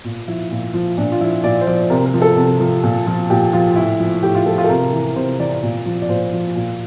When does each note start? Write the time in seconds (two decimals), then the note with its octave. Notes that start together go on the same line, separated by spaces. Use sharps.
0.04 A#2
0.28 F3 E4
0.51 A#2
0.74 F3
0.97 A#2 D4
1.12 F4
1.21 F3 E4
1.44 A#2 D5
1.61 C5
1.67 F3 D5
1.90 C3 A#4
2.06 A#4
2.14 F3
2.22 A4
2.37 C3
2.60 F3
2.83 A#2
3.07 F3
3.30 A#2 G4
3.53 F3 F4
3.76 A2 E4
4.00 F3
4.23 A2 G4
4.35 F4
4.46 F3 A4
4.58 F4
4.64 A4
4.69 C3 A#4
4.93 E3
5.16 C3 C5
5.39 E3 D5
5.63 A#2
5.86 F3
6.02 D5
6.09 A#2 C5
6.33 F3
6.55 A#2